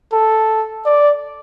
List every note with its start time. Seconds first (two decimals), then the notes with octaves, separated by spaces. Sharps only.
0.13 A4
0.86 D5